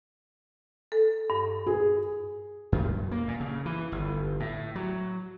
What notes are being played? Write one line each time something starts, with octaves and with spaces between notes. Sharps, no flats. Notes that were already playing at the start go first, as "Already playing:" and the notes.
A4
G2
G#4
F#2
A#3
A#2
C#3
E3
G1
A2
F#3